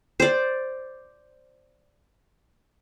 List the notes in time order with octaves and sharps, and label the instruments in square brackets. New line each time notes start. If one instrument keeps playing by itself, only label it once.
[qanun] C5 D5